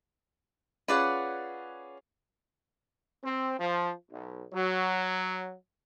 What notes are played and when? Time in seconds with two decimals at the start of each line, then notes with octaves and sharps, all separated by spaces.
0.88 C#4 F4 G#4 B4 D5 F#5
3.23 C4
3.59 F3
4.11 B1
4.53 F#3